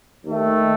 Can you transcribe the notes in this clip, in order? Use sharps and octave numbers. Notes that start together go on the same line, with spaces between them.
D#2 D#3 A3